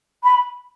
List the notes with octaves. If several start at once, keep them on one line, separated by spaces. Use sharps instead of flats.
B5